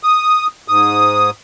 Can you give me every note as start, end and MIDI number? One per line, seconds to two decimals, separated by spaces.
0.03 0.47 87
0.68 1.30 44
0.68 1.30 87